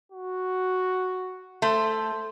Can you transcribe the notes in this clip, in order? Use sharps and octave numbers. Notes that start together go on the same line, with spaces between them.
F#4
A3 C5